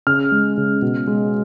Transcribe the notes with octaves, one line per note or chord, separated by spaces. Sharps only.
C#3 F6
G#3
C#3
B2
G#3